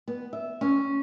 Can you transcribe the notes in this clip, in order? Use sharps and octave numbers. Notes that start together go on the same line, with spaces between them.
B3
E5
C#4